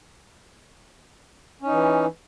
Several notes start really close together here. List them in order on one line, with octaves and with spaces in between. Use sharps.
C#4 D#4 E3